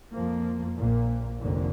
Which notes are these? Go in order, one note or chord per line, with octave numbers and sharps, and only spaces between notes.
F2 F3 A#3
A#1 A#2 A#3
F1 F2 D3 A#3